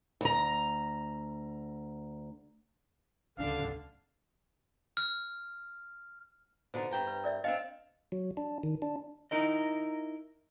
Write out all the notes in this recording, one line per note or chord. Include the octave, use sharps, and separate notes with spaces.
D2 A#5
D1 C#2 D3 C#4 D4 F5
F6
B2 D3 D#4 C5
G2 G5 A#5
B4
A#4 D5 E5
C4 D4 D#5 F5 G5
F#3
D4
D#3
D4
D#4 E4 A#4 D#5